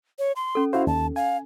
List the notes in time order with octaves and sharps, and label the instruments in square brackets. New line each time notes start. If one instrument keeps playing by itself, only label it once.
[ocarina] C#5
C6
[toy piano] C#4 A4
[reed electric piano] E4 F#4 C5 [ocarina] F5
[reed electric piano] D#2 [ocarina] A5
[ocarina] F5 [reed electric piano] G#5